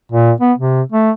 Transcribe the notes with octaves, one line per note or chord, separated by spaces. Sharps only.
A#2
B3
C3
A3